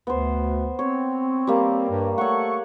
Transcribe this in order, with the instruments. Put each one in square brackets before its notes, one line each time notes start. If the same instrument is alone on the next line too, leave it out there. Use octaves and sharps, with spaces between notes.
[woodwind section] D2 [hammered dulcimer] B3 C5
[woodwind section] C4 [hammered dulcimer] C#5
[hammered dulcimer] G3 A#3
[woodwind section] G2
[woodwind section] A3 A4 C#6 [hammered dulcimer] C#5 F#5